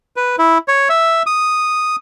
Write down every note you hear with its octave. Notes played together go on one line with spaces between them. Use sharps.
B4
E4
C#5
E5
D#6